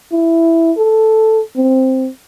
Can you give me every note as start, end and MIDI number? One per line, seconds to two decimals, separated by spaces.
0.12 0.72 64
0.78 1.41 69
1.56 2.09 60